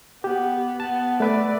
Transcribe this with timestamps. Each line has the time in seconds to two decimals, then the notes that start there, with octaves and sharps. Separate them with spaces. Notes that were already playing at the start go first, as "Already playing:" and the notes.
0.24 B3 G4
0.80 B3 A5
1.20 A3 B4 D5 E5